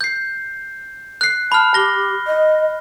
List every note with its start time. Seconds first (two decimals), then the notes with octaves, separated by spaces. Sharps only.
0.01 G6 C7
1.21 F#6 C7
1.52 A5 B5 F6
1.74 G4 A#6 G7
2.26 D#5